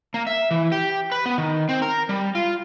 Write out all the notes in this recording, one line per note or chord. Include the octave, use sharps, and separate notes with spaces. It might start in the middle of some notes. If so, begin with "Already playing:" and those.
A#3
E5
E3
G4
B4
B3
D#3
C4
A#4
G3
F4